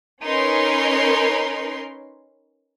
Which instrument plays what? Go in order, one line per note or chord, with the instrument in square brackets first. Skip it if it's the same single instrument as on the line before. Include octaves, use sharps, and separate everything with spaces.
[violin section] C#4 D#4 A#4 B4 C#5 C6